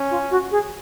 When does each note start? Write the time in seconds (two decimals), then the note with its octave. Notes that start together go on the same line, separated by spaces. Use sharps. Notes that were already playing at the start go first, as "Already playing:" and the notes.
Already playing: C#4
0.10 F4
0.31 F#4
0.51 G#4